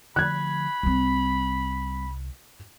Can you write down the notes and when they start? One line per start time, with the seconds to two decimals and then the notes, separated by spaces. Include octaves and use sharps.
0.16 D3 F3 A3 B5 F#6 G#6
0.83 C2 G3 C4